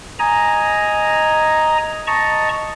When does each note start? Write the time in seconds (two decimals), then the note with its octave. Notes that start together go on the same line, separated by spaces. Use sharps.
0.19 D#5 G#5 A#5
2.07 D#5 A5 A#5 C#6